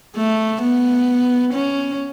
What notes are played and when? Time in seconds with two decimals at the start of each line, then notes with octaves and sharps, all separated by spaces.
0.16 A3
0.62 B3
1.54 C#4